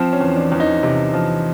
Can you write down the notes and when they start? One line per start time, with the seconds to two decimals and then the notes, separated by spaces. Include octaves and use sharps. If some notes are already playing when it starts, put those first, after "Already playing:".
Already playing: F3 C4
0.13 C#4
0.21 E2
0.36 D4
0.52 E2
0.60 D#4
0.83 C3
1.13 F3